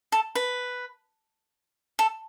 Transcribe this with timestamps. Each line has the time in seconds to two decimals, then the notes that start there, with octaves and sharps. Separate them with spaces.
0.12 A4
0.35 B4
1.99 A4